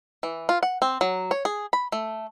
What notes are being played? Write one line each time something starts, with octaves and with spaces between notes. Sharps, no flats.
E3
F4
F#5
C4
F#3
C#5
G#4
B5
A3